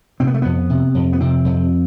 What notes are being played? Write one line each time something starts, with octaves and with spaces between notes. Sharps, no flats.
C3 C4
B3
A3
F2 B3
C3
F2
B3
C3 C4
F2